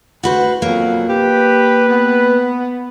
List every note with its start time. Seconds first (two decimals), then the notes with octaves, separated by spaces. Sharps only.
0.23 D2 F#4 B4 C5
0.62 F2 B2 F#3 A#3
1.08 G4 B4
1.88 B3